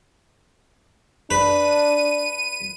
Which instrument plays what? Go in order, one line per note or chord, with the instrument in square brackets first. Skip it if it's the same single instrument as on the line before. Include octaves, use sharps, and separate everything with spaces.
[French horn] D4 [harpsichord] B4 [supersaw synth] D#7